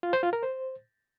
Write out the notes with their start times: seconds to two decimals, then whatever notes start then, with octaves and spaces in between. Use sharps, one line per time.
0.03 F4
0.13 C5
0.23 F4
0.33 A#4
0.43 C5